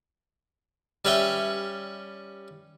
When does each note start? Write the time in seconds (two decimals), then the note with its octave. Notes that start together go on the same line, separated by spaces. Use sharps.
1.05 G3 C#4 B4 E5 G5